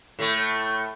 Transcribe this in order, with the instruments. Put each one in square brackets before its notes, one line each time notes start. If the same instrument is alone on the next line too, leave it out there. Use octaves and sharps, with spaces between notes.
[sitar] A2 A3